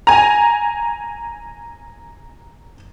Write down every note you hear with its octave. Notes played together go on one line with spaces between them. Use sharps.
G#5 A#5